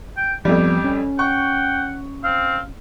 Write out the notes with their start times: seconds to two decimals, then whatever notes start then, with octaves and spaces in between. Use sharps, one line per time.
0.17 G5
0.45 F2 F3 G3 B3 G4
0.84 C#4
1.19 F#5 G5 C#6
2.24 C4 F5